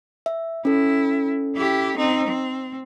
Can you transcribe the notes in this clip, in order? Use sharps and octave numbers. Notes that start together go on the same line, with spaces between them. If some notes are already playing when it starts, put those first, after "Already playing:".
E5
C#4 E4 A4
E4 G4
C4 D#4
C4